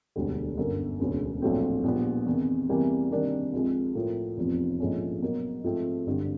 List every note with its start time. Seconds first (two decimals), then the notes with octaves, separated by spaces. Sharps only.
0.16 E1 D2 D3 G3
0.58 G1 F#2 D3 F#3 A#3
1.00 E1 D2 C#3
1.42 A#1 A2 F#3 A3 C4
1.84 A#1 A#2 G3 B3
2.26 E2 C3 D#3
2.69 E2 C3 E3 G3 A#3
3.11 C3 D#3 G3 A#3 D4
3.53 C2 C3 F3 G#3
3.95 A2 F3 A#3
4.38 F1 E2 C3 F3
4.80 A#1 G#2 F3 A3 C#4
5.22 B2 F#3 A#3
5.64 G#2 F3 A3 C4
6.06 G#1 G2 D3